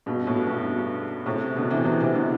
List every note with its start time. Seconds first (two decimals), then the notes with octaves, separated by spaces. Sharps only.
0.06 G2 B2
0.27 A2
0.47 G2 B2
1.26 A2 C3
1.56 B2 D3
1.70 C3 E3
1.85 C3 E3
2.00 C3 E3
2.15 B2 D3